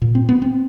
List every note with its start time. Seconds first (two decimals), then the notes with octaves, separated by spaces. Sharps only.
0.02 A#2
0.15 C4
0.29 B3
0.42 C4